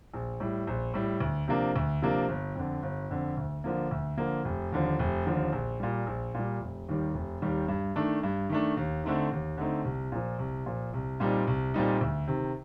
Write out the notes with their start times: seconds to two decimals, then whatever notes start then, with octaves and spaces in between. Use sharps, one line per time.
0.14 A#1
0.40 A2 G3
0.67 A#1
0.94 A2 G3
1.20 D2
1.48 C3 F3 A#3 D4
1.76 D2
2.02 C3 F3 A#3 D4
2.29 G1
2.55 F2 D3
2.83 G1
3.11 F2 D3
3.37 D2
3.64 D3 F3 A#3
3.91 D2
4.17 D3 F3 A#3
4.45 F1
4.72 D#2 D3 F3
4.99 F1
5.26 D#2 D3 F3
5.52 A#1
5.80 A#2 G3
6.07 A#1
6.34 A#2 G3
6.61 F1
6.88 D#2 D#3 G3
7.14 F1
7.42 D#2 D#3 G3
7.68 G2
7.96 D#3 A3 D4
8.23 G2
8.49 D#3 A3 D4
8.77 D#2
9.04 D3 A3 C4 D#4
9.31 D#2
9.57 D3 A3 C4 D#4
9.84 C2
10.12 A#2 F3
10.39 C2
10.66 A#2 F3
10.93 C2
11.20 A#2 G3 C4 D#4
11.47 C2
11.74 A#2 G3 C4 D#4
12.01 D2
12.27 C3 D#3